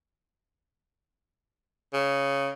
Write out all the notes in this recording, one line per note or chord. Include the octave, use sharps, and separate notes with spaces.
C#3